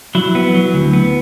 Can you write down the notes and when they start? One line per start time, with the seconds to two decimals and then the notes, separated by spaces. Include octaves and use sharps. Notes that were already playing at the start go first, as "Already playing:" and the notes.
0.15 F#3 E4
0.35 B3
0.54 F#3
0.74 D2
0.93 B3